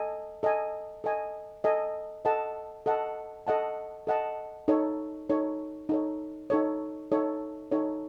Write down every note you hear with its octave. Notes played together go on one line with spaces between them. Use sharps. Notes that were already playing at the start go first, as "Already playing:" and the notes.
Already playing: A4 D#5 G#5
A4 D#5 G#5
A4 D#5 G#5
A4 D#5 G#5
A4 D#5 F#5 A5
A4 D#5 F#5 A5
A4 D#5 F#5 A5
A4 D#5 F#5 A5
D#4 A4 C#5
D#4 A4 C#5
D#4 A4 C#5
D#4 A4 C#5
D#4 A4 C#5
D#4 A4 C#5